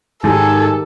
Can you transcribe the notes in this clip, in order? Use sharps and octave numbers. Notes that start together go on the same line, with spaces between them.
G#2 D#3 D#4 G4 A4 G#5